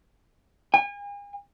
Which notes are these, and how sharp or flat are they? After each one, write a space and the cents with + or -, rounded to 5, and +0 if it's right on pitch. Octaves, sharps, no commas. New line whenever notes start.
G#5 -40